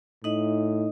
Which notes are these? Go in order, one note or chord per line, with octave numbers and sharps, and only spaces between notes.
A2 D#4 D#5